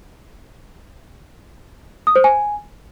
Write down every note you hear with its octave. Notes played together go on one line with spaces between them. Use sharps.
D#6
C5
G#5